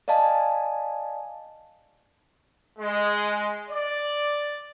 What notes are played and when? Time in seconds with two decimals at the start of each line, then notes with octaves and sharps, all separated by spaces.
0.08 D5 D#5 F5 G#5 A5
2.79 G#3
3.70 D5